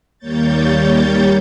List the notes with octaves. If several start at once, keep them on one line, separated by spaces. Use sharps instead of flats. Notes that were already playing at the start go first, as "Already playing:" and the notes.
D#2 G3 A#3 C#5 G6 A6